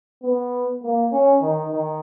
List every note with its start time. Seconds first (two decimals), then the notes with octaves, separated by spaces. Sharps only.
0.23 B3
0.83 A#3
1.12 C#4
1.42 D#3
1.72 D#3